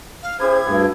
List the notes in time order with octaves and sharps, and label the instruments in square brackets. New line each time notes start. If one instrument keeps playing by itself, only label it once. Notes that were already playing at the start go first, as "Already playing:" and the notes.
[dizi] F5
[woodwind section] C#4 G#4 C5 [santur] E4 G4 B4 [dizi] G#6
[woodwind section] D2 G#4 [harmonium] G2 [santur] F#5